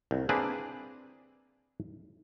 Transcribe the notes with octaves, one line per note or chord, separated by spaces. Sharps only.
C2
A#3 C4 D4 G#4 B4